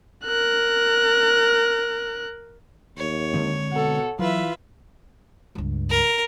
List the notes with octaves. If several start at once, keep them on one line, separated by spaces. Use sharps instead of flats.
A#4 F#6
D#2 C#5
D3 G#3 C4
B2 A4 F#5
E3 F#3 F4 B4 E5
C#2 G2
A#4